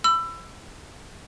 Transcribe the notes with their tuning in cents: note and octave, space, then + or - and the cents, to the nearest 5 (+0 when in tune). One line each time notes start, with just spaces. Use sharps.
B5 +25 E6 +25